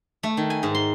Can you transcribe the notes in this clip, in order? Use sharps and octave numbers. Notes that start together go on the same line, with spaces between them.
A3
D#3
G#5
G#2
C6